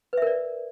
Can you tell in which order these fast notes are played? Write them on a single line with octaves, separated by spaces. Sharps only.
B4 E5 A#4 D5